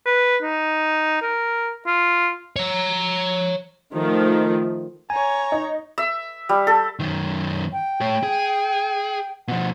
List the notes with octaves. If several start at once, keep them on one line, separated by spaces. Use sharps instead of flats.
B4
D#4
A#4
F4
C#5 A#5
D#3 F3 A3
C#5 G#5 A#5
D#4
E5
G3
A4
F#2 D#3
G5
A3 C#5
G#4
B2 F3 F#5